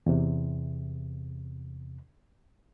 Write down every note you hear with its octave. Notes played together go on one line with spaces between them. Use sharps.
E2 C3